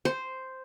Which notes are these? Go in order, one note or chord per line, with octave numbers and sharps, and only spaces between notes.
C5